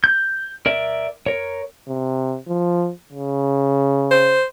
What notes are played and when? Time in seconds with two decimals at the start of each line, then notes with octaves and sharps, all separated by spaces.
0.04 G6
0.66 A#4 D5 E5
1.26 A#4 C#5
1.88 C3
2.48 F3
3.13 C#3
4.11 C5